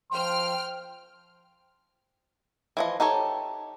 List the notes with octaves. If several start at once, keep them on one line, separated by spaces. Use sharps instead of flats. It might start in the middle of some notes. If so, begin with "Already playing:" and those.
F3 G5 C6 F6
E3 F3 D#5
D#4 G4 A4 C#5